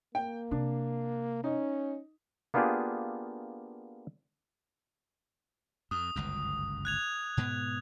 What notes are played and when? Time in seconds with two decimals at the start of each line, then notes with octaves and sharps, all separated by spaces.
0.15 A#3 G5
0.51 C3 D4
1.44 C#4 D#4
2.54 A#3 B3 D4 F4 G4 G#4
5.91 F2 D#6
6.16 G1 C#2 F#2
6.85 F#6 G#6 F7
7.37 G#2 B2 B3